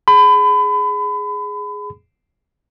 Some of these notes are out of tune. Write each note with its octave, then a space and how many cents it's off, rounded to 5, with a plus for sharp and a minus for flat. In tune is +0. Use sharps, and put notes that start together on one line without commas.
G#4 +0 B5 +30